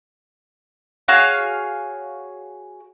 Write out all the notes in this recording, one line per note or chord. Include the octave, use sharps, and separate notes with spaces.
F#4 G#4 C#5 F5